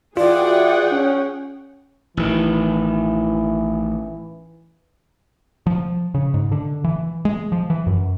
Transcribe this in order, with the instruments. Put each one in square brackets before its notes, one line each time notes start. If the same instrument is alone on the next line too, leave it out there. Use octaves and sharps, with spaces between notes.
[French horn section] E3 F#4 [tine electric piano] F4 [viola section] G#4 F#5 G5 [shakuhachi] D5
[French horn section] C#4
[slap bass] A1 D#3 [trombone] E3
[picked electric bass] F3
C#3
G#2
D3
E3
G#3
F3
E3
F#2